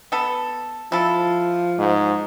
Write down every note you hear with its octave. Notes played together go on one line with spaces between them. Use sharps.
B3 A4
F3 E4 A4
G#2